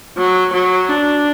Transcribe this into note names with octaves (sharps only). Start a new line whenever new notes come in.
F#3
F#3
D4